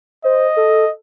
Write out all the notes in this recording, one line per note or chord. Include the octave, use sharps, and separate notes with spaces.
C5 D#5
A4